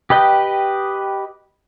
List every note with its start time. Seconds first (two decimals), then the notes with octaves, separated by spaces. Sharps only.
0.10 G4 B4 D#5 G5